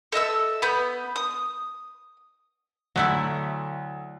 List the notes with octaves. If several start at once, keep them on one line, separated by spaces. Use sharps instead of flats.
A4 D#5 E5 E6
B3 B5 G6
D#6
D2 F#3 A3 E4